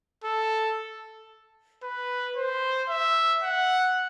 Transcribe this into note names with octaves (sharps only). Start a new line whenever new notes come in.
A4
B4
C5
E5
F#5